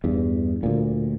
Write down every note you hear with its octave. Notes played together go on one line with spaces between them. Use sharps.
E2 G2
D2 A#2